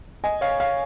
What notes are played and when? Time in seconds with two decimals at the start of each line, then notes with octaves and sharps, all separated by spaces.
0.24 D#5 G#5
0.41 C#5 F5
0.60 C#5 F5